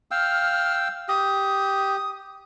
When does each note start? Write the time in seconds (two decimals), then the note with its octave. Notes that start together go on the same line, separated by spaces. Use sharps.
0.11 F5 G5 E6 F6
1.09 G4 D#6